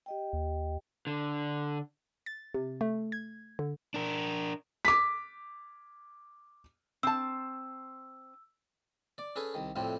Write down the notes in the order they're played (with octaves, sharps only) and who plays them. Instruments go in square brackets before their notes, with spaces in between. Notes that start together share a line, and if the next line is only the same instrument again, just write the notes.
[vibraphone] G4 D#5 G5
[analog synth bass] D#2
[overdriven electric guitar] D3
[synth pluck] A6
C3
A3
G#6
D3
[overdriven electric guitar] D4 A#4
[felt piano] D6 B6
[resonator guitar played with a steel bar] C4 A5 [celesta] E6
[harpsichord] D5 D6
C#4 G#4 A4 B4 G#5
C2 D#3
F2 A2 C3 G3 C4